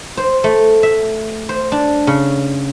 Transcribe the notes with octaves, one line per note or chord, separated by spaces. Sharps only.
C5
A3
E5
C5
D4
C#3